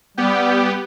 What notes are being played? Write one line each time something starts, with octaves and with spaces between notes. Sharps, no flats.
G3 B3 G4